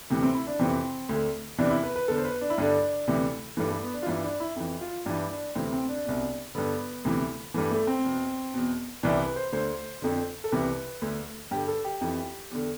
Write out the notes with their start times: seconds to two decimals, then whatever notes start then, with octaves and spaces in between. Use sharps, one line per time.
0.10 D2 C3 E3
0.23 C4
0.35 E4
0.47 D4
0.59 F2 C3 E3 C4
1.09 D2 D3
1.58 E2 C3 E3 D4
1.71 E4
1.83 B4
1.96 B4
2.08 E2 D3 A4
2.18 C5
2.25 B4
2.41 D4
2.50 E4
2.58 G2 D3 D4
3.08 D2 C3 E3
3.57 G2 E3 A3
3.70 A3
3.82 B3
3.94 D4
4.03 F4
4.06 G2 E3 E4
4.24 D4
4.40 E4
4.56 F2 E3
4.81 F4
5.06 G2 E3 D4
5.31 D4
5.55 D2 C3 E3 C4
5.73 C4
5.89 D4
6.05 C2 B2
6.55 G2 D3 B3
7.05 D2 C3 E3
7.54 G2 E3 A3
7.71 A3
7.87 C4
8.04 E2 B2
8.54 E2 B2
9.03 C2 C3 E3 D4
9.19 B4
9.36 C5
9.52 D2 D3 C5
10.02 F2 D3
10.44 A4
10.52 C2 C3 E3 B4
11.02 D2 D3
11.51 G2 D3 G4
11.68 A4
11.84 G4
12.01 F2 E3
12.51 E2 D3